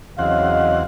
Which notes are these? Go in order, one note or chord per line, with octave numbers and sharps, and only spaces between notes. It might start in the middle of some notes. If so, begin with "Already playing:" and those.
E2 C#3 F#3 C4 D#5 F5 F#5